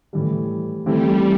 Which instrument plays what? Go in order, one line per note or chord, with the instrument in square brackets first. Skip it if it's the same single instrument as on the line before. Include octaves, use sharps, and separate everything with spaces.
[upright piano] A2 E3 G3
[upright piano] E3 A3 C4 E4 G4 [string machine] G3